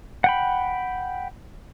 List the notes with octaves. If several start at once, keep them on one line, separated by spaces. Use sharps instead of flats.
F#5 G5 B5